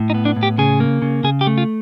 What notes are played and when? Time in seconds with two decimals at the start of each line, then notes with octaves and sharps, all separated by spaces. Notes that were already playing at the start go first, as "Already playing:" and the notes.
Already playing: A2
0.10 D#4
0.14 B3
0.25 D4
0.36 A2
0.43 G4
0.58 C#3 G#4
0.80 A#3
1.02 C#3
1.24 C#3 G#4
1.41 G4
1.47 A3
1.58 F4